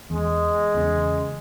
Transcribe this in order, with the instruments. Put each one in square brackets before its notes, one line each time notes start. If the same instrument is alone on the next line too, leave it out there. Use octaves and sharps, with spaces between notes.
[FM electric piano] E2 [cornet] G#3
[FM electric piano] E2 C#3